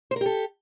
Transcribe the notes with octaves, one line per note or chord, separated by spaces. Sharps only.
G4 A4 A#4 C5